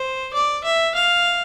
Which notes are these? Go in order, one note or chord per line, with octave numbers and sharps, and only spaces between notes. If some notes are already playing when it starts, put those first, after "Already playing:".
Already playing: C5
D5
E5
F5